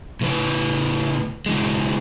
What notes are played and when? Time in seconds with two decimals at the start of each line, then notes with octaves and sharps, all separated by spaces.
0.21 A2 C#3 E4 B4
1.46 C#3 E3 G#3